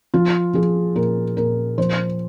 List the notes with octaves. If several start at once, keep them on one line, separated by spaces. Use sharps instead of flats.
F3 F4
F3 G#4
A#2 A#4
A#2 A#4
F3 C5